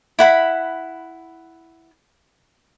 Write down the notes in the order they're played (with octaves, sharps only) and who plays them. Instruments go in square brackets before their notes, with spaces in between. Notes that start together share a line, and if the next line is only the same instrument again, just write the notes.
[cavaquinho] E4 F#5 B5